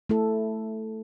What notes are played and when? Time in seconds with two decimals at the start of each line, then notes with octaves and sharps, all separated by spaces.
0.10 A3 E4 A4